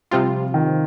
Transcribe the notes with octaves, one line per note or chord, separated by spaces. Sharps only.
C3 F3 G3 C4 F4
D#3